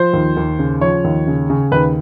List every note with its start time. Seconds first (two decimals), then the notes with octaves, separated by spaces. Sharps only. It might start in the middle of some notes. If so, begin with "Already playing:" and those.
Already playing: F3 C5
0.13 D#2
0.36 D#2
0.59 C#3
0.81 F3 C#5
1.04 D#2
1.27 C#3
1.50 C#3
1.71 D#2 B4